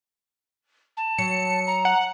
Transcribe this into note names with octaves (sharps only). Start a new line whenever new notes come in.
A5
F#3 C#7
A#5
F#5